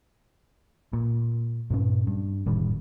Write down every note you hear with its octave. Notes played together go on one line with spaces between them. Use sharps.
A#2
G2 A#2 C#4
G2
F1 A2 D#3 G3